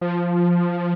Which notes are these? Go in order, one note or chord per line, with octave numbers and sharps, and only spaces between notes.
F3